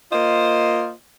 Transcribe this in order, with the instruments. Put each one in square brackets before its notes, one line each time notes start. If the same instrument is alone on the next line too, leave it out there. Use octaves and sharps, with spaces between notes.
[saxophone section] A#3 F4 C5 D#5